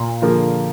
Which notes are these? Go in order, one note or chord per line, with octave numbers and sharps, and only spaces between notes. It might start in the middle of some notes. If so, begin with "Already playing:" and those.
Already playing: A#2
D3 F3 A#3 F4 G#4